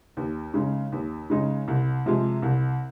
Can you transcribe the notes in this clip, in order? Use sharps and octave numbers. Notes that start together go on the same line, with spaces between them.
D#2
C#3 G#3 D#4
D#2
C#3 G#3 D#4
C2
C3 F3 G#3
C2